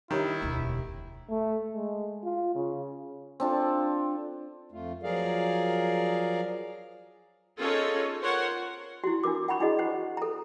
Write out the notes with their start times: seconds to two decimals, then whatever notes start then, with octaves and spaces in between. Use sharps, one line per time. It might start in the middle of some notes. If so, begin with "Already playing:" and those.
0.11 D#3 D4 E4 G4 C#5
0.42 E1 D2
1.30 A3
1.73 G#3
2.23 F4
2.55 C#3
3.40 C4 D4 F4 A4
4.72 F2 A3 F4
5.03 F3 F#3 G#4 A#4 D5 F5
7.58 C#4 D#4 F4 G#4 A4 C#5
8.20 F4 A#4 C5 C#5 F#5
9.04 E4 F#4
9.24 D4 F4 A#4 D6
9.48 F#5 A#5 B5 C#6
9.60 D4 E4 F#4 G#4 D#5
9.79 F#4 C5 F#5
10.17 A4 A#5